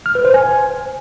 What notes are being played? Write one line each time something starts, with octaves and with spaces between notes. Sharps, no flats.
F6
B4
C5
G#5